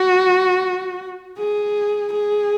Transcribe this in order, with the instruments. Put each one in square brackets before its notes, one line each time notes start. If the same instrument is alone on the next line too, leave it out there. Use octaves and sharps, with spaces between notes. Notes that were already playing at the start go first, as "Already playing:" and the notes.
Already playing: [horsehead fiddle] F#4
G#4
G#4